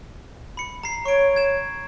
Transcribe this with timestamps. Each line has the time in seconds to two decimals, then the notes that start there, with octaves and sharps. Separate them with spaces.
0.57 B5 C#7
0.84 A#5 C7
1.05 C#5 C#6 D7
1.36 G#6 E7